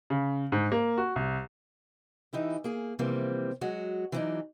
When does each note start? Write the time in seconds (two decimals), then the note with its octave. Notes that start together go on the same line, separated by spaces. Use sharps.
0.10 C#3
0.52 G#2
0.72 A#3
0.98 F#4
1.16 C2
2.33 E3 D#4 E4 G4
2.64 A#3 G#4
2.99 C3 E3 F3 G3 A#3 C4
3.61 F#3 G#3 F#4
4.12 E3 F#3 G3 B3 D4 D#4